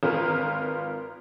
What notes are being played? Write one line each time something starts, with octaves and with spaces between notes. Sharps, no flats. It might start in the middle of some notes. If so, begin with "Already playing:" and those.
G#1 F4 A#4 B4 A#5 F6